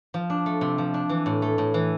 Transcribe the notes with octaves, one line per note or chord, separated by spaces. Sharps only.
F3
D4
A3
C3
F3
D4
E3
A2
A3
A2
E3